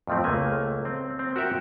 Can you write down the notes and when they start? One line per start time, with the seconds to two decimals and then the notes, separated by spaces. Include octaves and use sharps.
0.07 F2 A2 F3 A3 C4
0.24 C#2 A3 A#3 G#5
0.85 C4
1.19 C4
1.36 F#4 G4 A#4 E5 F#5 G5